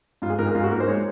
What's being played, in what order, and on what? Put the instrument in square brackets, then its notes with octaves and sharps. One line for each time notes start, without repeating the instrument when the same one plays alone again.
[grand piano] G#2 F4
G#4
G#2 A#4
G#4
G#2 F4
F#4
A#3 A#4
C5
G#3 C#5